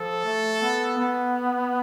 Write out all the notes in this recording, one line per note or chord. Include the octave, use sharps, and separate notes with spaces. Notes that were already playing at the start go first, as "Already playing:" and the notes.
Already playing: F3 A4
A3
B3
B3